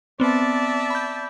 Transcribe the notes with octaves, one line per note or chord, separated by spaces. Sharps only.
B3 C4 D5 E5 A5
B5 G6